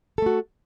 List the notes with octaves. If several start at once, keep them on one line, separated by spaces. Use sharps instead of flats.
A3 F#4 A4